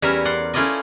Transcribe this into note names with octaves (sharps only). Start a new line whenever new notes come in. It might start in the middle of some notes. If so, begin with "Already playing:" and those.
E2 G3 C#4 A#4 E5
D5 F#5 C6
A3 C#4 E4 F4 D5 D#5